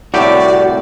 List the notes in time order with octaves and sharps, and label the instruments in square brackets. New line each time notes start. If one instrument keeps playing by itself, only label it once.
[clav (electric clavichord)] C2 A2 G4 [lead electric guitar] F#4 [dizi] D5